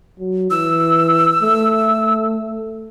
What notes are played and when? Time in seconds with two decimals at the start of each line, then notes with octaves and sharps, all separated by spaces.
0.19 F#3
0.51 E3 E6
1.42 A3